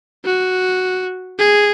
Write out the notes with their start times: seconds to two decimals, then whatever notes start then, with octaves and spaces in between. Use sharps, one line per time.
0.25 F#4
1.39 G#4